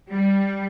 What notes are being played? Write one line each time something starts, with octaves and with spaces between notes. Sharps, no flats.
G3